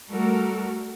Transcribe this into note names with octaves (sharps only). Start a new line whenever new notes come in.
G3 A3 F#4 A4 A#4